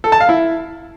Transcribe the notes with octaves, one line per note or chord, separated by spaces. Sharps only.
A4
A5
F5
E4